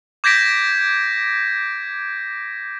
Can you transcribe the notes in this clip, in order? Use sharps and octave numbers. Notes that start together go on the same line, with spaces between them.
D6 G6 G#6 A#6 B6 D7